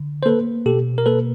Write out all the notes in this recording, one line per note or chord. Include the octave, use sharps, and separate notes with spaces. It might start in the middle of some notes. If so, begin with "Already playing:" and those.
Already playing: D3
C5
A#3 A4 B4
B2 G4 A4
A#4
A#3 A4 B4